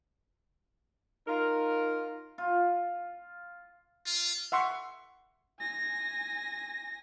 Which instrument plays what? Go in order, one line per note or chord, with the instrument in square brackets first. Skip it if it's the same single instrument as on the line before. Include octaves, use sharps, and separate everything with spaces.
[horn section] D#4 F4 A#4
[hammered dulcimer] F4
[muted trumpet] F4
[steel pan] E5 F#5 C6 C#6
[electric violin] G#5 A#6